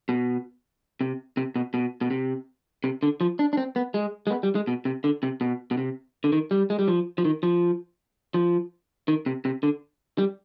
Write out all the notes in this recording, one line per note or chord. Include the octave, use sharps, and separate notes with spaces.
B2
C3
C3
B2
B2
B2
C3
C3
D3
F3
D4
D4
C4
B3
G#3
G#3
B3
G3
G#3
B2
C3
D3
C3
B2
B2
C3
D3
D#3
G3
G#3
G3
F3
F3
D#3
F3
F3
D#3
C3
C3
D3
G3